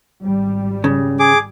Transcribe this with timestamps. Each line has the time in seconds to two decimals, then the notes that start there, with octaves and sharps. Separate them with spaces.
0.22 G#1 G3
0.84 C#3
1.19 G#4 D6